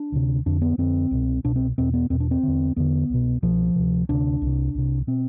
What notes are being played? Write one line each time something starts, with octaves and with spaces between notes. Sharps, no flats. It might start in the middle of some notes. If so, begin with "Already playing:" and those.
Already playing: D4
D2 C3
F2 D3 D4
B3
F2 D3 C4
C2 B2
C2 B2 D4
C4
E2 B2 C4
B3
E2 B2 C4
D4
C4
E2 D3
E2 D3 B3
C2 B2
C2 B2 F3
D2 C3
D2 C3 D4
C2
C3
C2 C3
B2 C4